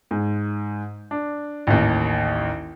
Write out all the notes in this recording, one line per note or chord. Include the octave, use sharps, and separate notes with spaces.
G#2
D4
A1 D#2